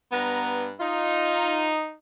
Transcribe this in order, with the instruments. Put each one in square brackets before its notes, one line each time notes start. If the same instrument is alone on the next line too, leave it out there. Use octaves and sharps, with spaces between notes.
[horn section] G2 B4 A#5 [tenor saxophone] B3
[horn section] D#4 [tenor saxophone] F4